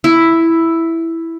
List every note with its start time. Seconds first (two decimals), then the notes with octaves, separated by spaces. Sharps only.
0.04 E4